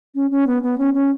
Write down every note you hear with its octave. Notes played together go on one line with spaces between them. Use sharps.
C#4
C#4
B3
B3
C#4
C#4